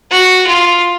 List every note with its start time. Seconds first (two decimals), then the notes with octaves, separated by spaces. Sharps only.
0.10 F#4
0.46 F4